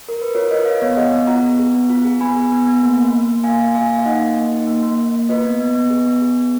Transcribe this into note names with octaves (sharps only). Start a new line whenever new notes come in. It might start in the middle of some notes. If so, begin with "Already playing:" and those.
A#4
B4
F4 A#4 C#5
F4 B4 D#5
F4 C#5 F5
B3 C#5 F5
G#4 D#5 F#5
B3
F4 F#5 A#5
B3
G#4
B3
F4
G#4
B3 G#5 B5
G#4
B3
B3
A#3
A#3
A#3
A#3
A#3 F5 G#5
A#3
A#3 F5 G#5
A#3
F5
D#4 D#5 F#5
A#3
A#3
D#4
A#3
A#3
A#3
A#3
F4 B4 D#5
B3
B3
B3
G#4
B3
G#4
B3